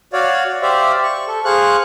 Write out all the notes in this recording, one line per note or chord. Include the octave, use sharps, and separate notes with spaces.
F#4 C#5 D5 F5
G4 C5 D5 E5 F5
C#6
A4
G#4 C5 F5 C#6 F#6